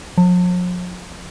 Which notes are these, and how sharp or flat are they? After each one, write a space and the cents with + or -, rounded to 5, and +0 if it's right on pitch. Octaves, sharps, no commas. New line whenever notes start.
F3 +45